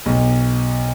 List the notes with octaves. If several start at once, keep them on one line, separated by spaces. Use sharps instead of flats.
B1